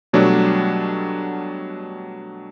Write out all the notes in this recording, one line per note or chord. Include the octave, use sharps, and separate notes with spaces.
B2 F#3 G3 A3 D4